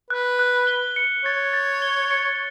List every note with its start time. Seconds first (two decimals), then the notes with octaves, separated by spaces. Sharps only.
0.10 B4 F#6
0.39 F#6
0.67 G7
0.96 C#7
1.25 C#5 A6
1.53 A6
1.82 G7
2.11 C#7